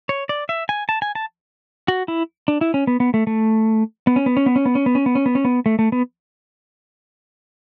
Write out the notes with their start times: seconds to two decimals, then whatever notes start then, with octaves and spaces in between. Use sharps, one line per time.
0.09 C#5
0.29 D5
0.49 E5
0.69 G#5
0.89 A5
1.02 G#5
1.15 A5
1.88 F#4
2.08 E4
2.48 D4
2.61 E4
2.74 C#4
2.87 B3
3.00 B3
3.14 A3
3.27 A3
4.07 B3
4.16 C#4
4.26 B3
4.37 C#4
4.46 B3
4.56 C#4
4.66 B3
4.75 C#4
4.86 B3
4.95 C#4
5.06 B3
5.15 C#4
5.26 B3
5.35 C#4
5.45 B3
5.66 A3
5.79 A3
5.92 B3